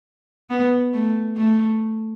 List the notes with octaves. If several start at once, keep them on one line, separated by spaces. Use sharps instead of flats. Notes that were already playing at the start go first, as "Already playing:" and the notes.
B3
A3
A3